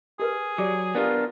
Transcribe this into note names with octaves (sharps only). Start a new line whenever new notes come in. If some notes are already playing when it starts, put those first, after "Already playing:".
G4 G#4 A#4 B4
F#3 G4 D5 D6
B3 D4 F4 G4 A#4 F5